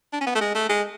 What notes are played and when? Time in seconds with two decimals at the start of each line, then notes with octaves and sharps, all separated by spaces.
0.13 D4
0.21 C#4
0.27 B3
0.35 A3
0.41 G#3
0.55 A3
0.69 G#3